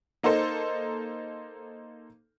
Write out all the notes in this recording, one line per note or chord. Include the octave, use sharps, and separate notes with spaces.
A#3 D#4 A4 C5